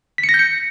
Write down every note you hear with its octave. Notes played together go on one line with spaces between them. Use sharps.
B6
C#7
A#6
G6
C#7